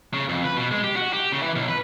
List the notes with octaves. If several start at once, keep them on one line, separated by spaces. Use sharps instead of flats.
C#3
F2
B4
B2
G#3
G4
F#4
G4
C#3
E3
B1
B4